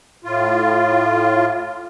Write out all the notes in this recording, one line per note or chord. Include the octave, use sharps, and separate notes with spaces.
A2 F4